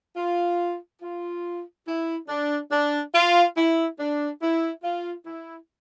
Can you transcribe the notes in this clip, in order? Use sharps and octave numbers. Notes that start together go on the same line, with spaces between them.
F4
F4
E4
D4
D4
F4
E4
D4
E4
F4
E4